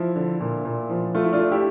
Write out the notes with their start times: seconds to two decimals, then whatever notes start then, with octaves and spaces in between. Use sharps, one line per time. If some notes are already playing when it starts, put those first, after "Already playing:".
Already playing: F3 E4
0.15 D3
0.40 A#2
0.65 A#2
0.89 F3
1.15 A3 F4
1.24 E4
1.33 D4 F4
1.39 A3
1.52 E4 G4